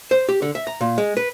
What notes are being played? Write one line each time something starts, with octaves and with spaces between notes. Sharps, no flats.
C5
G4
D3
E5
A#5
A#2
G#3
B4